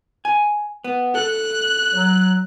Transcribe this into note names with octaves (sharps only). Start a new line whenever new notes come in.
G#5
B3
A4 F#6
F#3